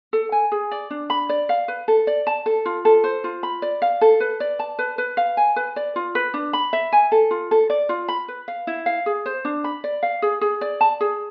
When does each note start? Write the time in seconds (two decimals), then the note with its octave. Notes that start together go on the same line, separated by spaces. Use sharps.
0.13 A4
0.32 G#5
0.52 G#4
0.71 D5
0.90 D4
1.10 B5
1.29 D5
1.49 F5
1.68 B4
1.88 A4
2.07 D5
2.27 A5
2.46 A4
2.66 F4
2.85 A4
3.04 C5
3.24 F4
3.43 B5
3.62 D5
3.82 F5
4.01 A4
4.20 B4
4.40 D5
4.59 A5
4.79 B4
4.98 B4
5.17 F5
5.37 G#5
5.56 B4
5.76 D5
5.96 F4
6.15 B4
6.34 D4
6.53 B5
6.73 E5
6.92 G#5
7.12 A4
7.31 F4
7.51 A4
7.70 D5
7.89 F4
8.08 B5
8.28 B4
8.48 F5
8.67 E4
8.86 F5
9.06 G#4
9.26 C5
9.45 D4
9.64 B5
9.84 D5
10.03 F5
10.22 G#4
10.41 G#4
10.61 D5
10.81 A5
11.01 G#4